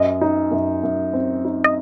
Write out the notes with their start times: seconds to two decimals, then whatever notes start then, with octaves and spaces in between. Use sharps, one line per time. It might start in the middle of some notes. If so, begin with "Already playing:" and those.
Already playing: F#2 D#5
0.21 D#4
0.51 F#2
0.83 F#2
1.13 C4
1.45 D#4
1.64 D#5